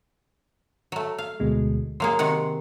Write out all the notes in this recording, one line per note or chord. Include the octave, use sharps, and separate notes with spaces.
F#3 A3
F5
D2 B2 G#3
F#3 A#3 G#4 C6
C3 D#3 F#5